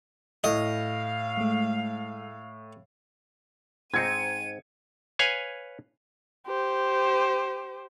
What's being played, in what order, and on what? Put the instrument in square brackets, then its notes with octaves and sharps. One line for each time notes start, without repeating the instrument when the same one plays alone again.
[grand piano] A2 [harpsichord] D#5 [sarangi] F5
[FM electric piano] G#3 A3
[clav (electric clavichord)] G#2 C4 D#4 [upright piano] G#6 C#7 [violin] D#7
[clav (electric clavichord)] B4 C#5 F5 G#5
[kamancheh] G4 C5